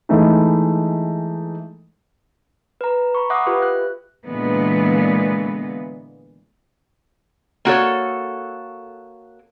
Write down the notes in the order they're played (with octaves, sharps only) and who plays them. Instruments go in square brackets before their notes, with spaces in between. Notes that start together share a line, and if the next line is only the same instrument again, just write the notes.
[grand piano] E3 G#3 A3 D#4
[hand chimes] B4 A#5
A#5 B5 C#6
E5 F#5 D6 D#6 F#6
F4 G4 B4
E5 F#6
[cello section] A#2 D3 E3 G#3 B3
[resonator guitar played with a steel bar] A#3 F#4 A4 C#5